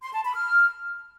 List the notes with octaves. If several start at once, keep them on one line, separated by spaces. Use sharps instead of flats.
C6
A5
B5
F6